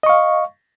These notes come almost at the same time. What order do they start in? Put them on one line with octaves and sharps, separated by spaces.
D#5 C#6 F5